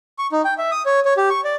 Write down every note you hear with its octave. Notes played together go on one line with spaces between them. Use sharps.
C#6
D#4
G5
E5
D#6
C#5
C#5
G4
C#6
D5